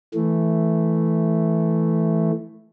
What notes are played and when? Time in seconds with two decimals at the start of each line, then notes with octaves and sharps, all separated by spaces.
0.14 E3 A3